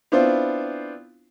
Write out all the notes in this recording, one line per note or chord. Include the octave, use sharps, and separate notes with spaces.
B3 C4 D4 E4 F4 C5